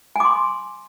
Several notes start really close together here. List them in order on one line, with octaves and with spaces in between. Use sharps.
G#5 D6 C6